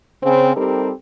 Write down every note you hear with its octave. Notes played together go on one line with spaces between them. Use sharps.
C#3 C4
G3 C4 D#4 G4 A4 A#4